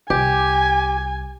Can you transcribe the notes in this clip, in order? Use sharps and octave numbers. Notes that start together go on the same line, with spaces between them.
C2 G4 G#5